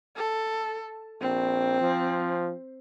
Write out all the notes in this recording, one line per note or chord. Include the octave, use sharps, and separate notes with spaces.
A4
A#1 C4
F3